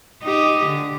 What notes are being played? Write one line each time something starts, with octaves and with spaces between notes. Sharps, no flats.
D#4 G4 D#5
D3